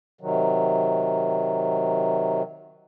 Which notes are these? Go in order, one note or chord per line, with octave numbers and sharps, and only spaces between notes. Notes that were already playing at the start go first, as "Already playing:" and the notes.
C3 D#3 F#3